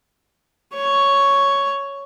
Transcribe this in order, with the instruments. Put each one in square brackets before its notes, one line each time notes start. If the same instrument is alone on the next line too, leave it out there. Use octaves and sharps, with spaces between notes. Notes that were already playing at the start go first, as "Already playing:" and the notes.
[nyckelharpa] C#5 C#6